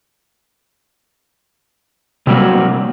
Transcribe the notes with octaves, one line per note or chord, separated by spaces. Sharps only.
C3 F#3 G3 A#3 C4 F#4